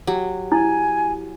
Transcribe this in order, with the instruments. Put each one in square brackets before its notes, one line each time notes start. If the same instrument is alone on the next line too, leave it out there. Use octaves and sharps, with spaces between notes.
[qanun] F#3 [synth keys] G4
[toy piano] E4 [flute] G#5